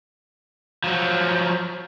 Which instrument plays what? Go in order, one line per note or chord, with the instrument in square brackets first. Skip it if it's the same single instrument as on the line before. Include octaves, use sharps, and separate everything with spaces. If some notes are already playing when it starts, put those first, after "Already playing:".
[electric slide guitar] F3 F#3